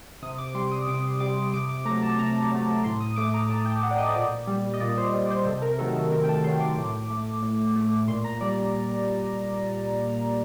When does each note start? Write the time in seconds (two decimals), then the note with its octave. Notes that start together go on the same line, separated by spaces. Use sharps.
0.22 C3 D#6
0.38 D6
0.49 D6
0.55 G3 C6
0.72 D#6
0.87 C3 D6
1.20 G3 D6
1.53 C3 D6
1.69 D6
1.85 A3 A#5
1.90 F#3
2.02 A5
2.18 C3 A#5
2.51 F#3 A3
2.84 A2 C6
3.00 D#6
3.16 A3 D6
3.34 A#5
3.49 A2 A5
3.65 G5
3.82 A3 F#5
3.91 D5
3.98 D#5
4.09 C5
4.15 A#2 D5
4.47 G3
4.74 D#5
4.80 A#2 D5
4.98 C5
5.13 G3
5.26 D5
5.31 C5
5.46 C3 A4
5.62 A#4
5.79 D#3 F#3 A3 A4
5.96 A4
6.11 C3 A#4
6.24 G5
6.29 A5
6.44 D#3 C6
6.47 F#3 A3
6.60 D6
6.78 A2
7.10 A3
7.42 A2
7.76 A3
8.08 A#2 C6
8.24 A#5
8.41 G3 D5